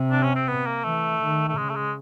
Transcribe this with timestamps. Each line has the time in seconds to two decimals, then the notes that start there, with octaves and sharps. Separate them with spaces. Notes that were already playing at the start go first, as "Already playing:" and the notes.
Already playing: C3
0.11 D4
0.23 C#4
0.36 C4
0.48 B3
0.66 A#3
0.84 E3 A3
1.21 D#3
1.49 A3
1.57 C#3 G#3
1.69 A3
1.76 G#3